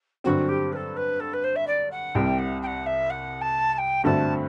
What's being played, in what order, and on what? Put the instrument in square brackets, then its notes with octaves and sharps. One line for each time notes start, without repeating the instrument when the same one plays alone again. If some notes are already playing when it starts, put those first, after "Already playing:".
[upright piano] G2 D3 F#3 C4 [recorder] F#4
[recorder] G4
B4
A4
B4
A4
B4
C5
E5
D5
F#5
[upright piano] C2 C3 G3 [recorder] G5
[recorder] F#5
G5
F#5
E5
F#5
A5
A5
G5
[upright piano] G2 D3 A3 C4 F#4 [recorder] A5